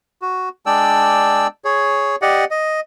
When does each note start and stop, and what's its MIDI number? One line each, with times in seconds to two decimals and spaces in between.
0.22 0.49 66
0.66 1.47 56
0.66 1.47 62
0.66 1.47 74
0.66 1.47 79
0.66 1.47 88
1.65 2.16 68
1.65 2.16 73
2.22 2.45 67
2.22 2.45 74
2.22 2.45 75
2.22 2.45 78
2.51 2.80 75